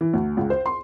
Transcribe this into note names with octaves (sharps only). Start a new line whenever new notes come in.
E3
D2
C#2
C5
C6